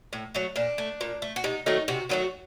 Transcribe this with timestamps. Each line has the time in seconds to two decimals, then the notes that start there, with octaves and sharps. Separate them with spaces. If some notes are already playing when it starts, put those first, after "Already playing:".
0.13 A2
0.34 F#3 A3
0.56 A#2 D4
0.78 A3
1.01 A#2
1.22 A3
1.36 F#4
1.44 C3 D#4
1.66 D#3 F#3 A3 D#4
1.88 C3 F#4
2.09 D#3 F#3 A3 F#4